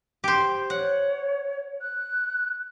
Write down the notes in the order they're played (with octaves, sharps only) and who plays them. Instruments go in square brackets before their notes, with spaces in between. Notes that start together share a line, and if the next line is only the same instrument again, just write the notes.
[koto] G4 C5
[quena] C#5 [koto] F#5
[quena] F#6